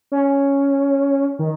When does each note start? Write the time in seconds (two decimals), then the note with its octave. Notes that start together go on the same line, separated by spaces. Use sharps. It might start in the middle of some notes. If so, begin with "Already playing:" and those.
0.12 C#4
1.39 D#3